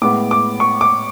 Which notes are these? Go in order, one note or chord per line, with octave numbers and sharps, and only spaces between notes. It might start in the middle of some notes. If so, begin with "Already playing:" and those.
A2 G#3 B3 D6
D6
C#6
D6